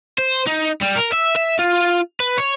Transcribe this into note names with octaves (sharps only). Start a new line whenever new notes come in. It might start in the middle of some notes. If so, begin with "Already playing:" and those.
C5
D#4
G3
A#4
E5
E5
F4
B4
C#5